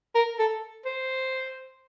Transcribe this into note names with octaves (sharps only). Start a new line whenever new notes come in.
A#4
A4
C5